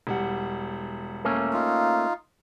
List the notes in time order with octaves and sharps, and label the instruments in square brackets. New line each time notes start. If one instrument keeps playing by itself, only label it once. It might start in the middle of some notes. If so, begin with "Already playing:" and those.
[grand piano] E1 G3 F#5
[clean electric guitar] A3 A#3 C#4
[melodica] D#4 F4